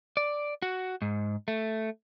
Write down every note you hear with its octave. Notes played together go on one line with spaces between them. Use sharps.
D5
F#4
G#2
A3